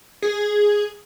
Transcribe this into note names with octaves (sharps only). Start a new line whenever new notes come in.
G#4